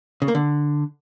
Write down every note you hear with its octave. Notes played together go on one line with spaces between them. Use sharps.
C#3
A#3
D3